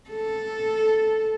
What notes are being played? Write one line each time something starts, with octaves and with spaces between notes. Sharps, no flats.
A4